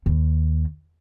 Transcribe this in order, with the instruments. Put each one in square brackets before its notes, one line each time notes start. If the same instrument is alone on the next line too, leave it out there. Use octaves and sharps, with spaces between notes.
[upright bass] D#2